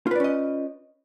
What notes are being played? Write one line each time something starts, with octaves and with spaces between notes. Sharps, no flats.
C#4 F4 B4 D5 D#5